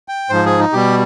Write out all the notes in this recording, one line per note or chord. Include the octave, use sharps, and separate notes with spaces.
G5
G#2 F3 C5
G#4
D#4
B2 G3 G4